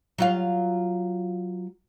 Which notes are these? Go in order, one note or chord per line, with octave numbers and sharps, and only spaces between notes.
F#3 F4 F5